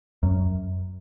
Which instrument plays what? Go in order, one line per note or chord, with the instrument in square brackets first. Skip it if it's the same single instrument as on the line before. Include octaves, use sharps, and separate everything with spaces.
[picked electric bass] F#2